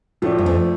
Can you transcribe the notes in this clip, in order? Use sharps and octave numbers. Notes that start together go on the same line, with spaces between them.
A2 F3 A3 D4
G2
F2